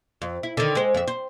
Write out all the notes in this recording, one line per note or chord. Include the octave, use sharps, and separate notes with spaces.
F2
E4
D3 D#3
G#3 C5
F2 E5
C5